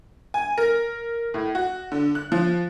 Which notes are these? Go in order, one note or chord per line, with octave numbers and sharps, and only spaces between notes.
G#5
A#4
A2
F#4
D3
F#6
F3